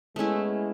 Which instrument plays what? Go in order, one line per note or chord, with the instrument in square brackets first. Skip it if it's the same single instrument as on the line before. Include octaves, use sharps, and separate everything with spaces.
[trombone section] G#3 B3 [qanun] A3 C#4 E4